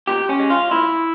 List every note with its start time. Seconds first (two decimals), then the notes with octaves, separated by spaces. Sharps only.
0.07 A#2 G4
0.29 C#4
0.39 G#3
0.50 F4
0.71 A#2 E4